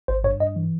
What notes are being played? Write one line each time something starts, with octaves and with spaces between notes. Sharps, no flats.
G#1 C5
G2 C#5
G2 D#5
E3